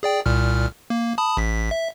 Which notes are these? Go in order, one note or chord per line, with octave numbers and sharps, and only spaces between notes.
G#4 D5 G5
C2 A#2 F6
A#3
A5 B5 D#6
A1 B6
E5